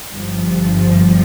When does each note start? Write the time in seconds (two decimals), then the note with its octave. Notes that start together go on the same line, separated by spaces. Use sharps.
0.14 G1 G2 F3